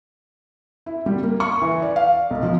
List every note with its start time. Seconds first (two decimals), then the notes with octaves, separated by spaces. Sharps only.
0.86 E4
1.06 G3
1.23 A#3
1.40 C#6
1.62 E3
1.82 D5
1.96 F5
2.31 B1
2.43 F3